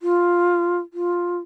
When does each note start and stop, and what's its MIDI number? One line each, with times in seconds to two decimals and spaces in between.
0.02 0.78 65
0.93 1.37 65